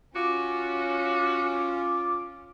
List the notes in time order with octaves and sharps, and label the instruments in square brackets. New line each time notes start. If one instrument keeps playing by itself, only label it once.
[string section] C#4 [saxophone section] F4 [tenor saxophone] F#4 [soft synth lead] D6